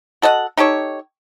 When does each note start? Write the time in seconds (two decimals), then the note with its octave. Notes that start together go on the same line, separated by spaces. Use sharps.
0.22 F#4 A4 D#5 F#5
0.57 D#4 G4 A4 C#5